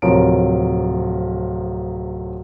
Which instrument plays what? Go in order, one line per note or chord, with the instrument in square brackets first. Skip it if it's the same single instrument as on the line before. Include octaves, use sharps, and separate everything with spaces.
[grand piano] D1 C3 F3 A#4 C#5 D7